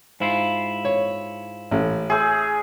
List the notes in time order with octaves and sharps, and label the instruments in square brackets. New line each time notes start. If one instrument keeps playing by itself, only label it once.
[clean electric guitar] G#2 E4 F4 [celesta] C5 F5
[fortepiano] C#5
A1
[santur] G#4 C#5 [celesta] E5 E6 G6